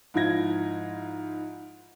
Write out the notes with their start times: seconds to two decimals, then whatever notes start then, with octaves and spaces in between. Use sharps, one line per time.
0.14 G#2 F3 E4 F4 G#6 A#6